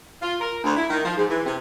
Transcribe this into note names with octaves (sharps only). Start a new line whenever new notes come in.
F4
A#4
D2
E4
D#3
F3
G#2
E3
C3